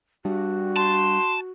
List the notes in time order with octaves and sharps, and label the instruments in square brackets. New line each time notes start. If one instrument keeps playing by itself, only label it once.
[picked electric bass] G3 D4 [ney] F#4
[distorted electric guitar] A5 [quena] C6